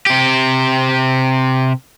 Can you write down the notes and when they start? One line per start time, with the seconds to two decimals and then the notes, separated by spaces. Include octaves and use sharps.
0.07 C3 G4